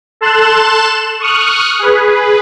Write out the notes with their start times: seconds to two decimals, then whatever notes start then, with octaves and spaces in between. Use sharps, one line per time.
0.21 A4 A5 C6 F#6 E7
1.20 C#6 D#6 F6 F#6
1.79 G#4 B4